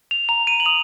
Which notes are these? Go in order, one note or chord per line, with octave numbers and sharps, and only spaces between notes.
F7
A#5 F7
D#7
F#7
D#6 F7